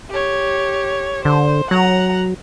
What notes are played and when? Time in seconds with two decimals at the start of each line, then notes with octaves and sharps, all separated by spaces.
0.11 G4 C#5
1.25 D3 C5
1.71 F#3 F#5 A#5